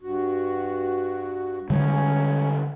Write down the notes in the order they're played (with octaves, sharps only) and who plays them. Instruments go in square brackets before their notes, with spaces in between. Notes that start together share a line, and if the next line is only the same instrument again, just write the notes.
[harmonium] G2 F#4
[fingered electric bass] D3 G3 G#3 [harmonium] C#4 C#5